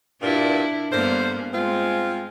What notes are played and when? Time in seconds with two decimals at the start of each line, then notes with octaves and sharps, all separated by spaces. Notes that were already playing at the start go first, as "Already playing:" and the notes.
0.22 G2 A#2 D4 E4
0.92 G2 D3 A#3 B3 A#4 C5
1.53 G#3 C4 F4